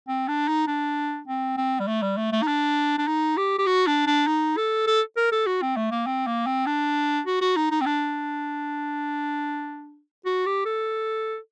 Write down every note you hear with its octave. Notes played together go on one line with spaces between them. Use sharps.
C4
D4
D#4
D4
C4
C4
G3
A3
G3
A3
A3
D#4
D4
D4
D#4
G4
G4
F#4
D4
D4
D#4
A4
A4
A#4
A4
F#4
C4
A3
A#3
C4
A#3
C4
D4
F#4
F#4
D#4
D#4
C4
D4
F#4
G4
A4